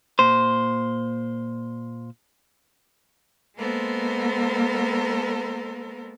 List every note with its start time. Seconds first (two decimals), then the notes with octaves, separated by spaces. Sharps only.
0.19 A#2 C5
3.57 G#3 A#3 B3 A4 A#4 C5